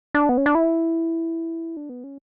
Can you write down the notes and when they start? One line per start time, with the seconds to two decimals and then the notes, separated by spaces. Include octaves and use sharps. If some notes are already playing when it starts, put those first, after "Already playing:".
0.14 D4
0.29 B3
0.37 C#4
0.46 D4
0.55 E4
1.77 D4
1.89 B3
2.04 C#4